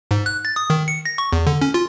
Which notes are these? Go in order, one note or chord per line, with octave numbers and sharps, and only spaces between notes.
G#2
F#6
A6
D#6
D#3
C#7
A#6
C#6
E2
D3
C#4
F4